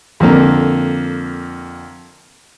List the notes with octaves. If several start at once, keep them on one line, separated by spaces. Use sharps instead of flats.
F2 D3 A#3